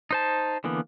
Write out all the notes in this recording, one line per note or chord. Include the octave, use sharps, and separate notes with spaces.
D#4 C5 A5
D3 E3 A#3 B3